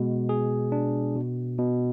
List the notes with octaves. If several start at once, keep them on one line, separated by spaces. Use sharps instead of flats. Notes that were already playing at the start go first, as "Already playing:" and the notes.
Already playing: B2 G#3
G#4
D4
B2
B2